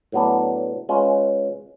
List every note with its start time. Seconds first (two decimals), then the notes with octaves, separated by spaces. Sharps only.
0.12 A2 F#3 B3 D4
0.89 G#3 C#4 F4 B4